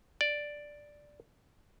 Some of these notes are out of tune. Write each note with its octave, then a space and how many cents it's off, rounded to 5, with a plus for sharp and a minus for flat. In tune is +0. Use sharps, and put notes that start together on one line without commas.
D5 +0